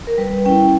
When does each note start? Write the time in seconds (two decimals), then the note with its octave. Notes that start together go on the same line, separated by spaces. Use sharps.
0.07 A#4
0.18 G3 B4
0.45 C#4 E4 G5